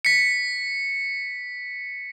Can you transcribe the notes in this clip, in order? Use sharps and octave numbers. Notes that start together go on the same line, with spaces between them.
B6 C#7